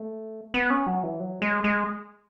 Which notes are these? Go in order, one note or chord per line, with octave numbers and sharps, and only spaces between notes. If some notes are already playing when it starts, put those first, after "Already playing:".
Already playing: A3
B3
C#4
F#3
E3
F#3
G#3
G#3